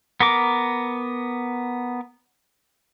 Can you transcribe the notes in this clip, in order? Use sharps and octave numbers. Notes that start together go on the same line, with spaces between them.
B3 A#4 D6